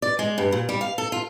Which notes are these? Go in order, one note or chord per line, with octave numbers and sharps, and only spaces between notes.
D5
G#3
G2
A#2
G3
F5
A4
F4